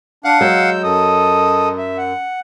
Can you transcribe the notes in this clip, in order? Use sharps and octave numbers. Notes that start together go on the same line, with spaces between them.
D4 F5 F#5 F#6
F#3 G#3 E6 G6
F#2 A4 D#5 D#6
E5
F#5